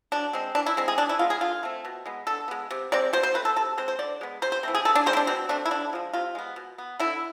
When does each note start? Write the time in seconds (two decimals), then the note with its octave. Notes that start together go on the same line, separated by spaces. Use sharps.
0.12 B2 D4
0.33 G#3 C4
0.55 E3 D4
0.66 E4
0.77 G#3 C4
0.88 G#4
0.98 E3 D4
1.09 E4
1.19 G#3 B3 F4
1.30 G#4
1.41 D3 F4
1.63 A3 C4
1.85 B2
2.06 G#3 B3
2.27 D3 A4
2.48 G#3 B3
2.71 C3
2.92 G#3 C4 D5
3.13 B2 C5
3.23 C5
3.34 A3 C4 B4
3.45 A4
3.56 C3 A4
3.78 G#3 C4 C5
3.88 C5
3.99 D3 D5
4.21 G#3 B3
4.42 C3 C5
4.52 C5
4.63 E3 A3 C4
4.75 G#4
4.85 E3 A4
4.95 D4
5.06 G#3 C4 C5
5.13 E4
5.17 D4
5.27 B2 C4
5.49 A3 C4 D4
5.66 E4
5.71 D3 D4
5.93 F3 G#3
6.13 C3 F4
6.35 G#3 B3
6.56 B2
6.78 B3
7.00 D3 E4